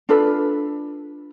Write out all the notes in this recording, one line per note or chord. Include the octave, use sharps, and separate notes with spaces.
D4 F4 A4 B4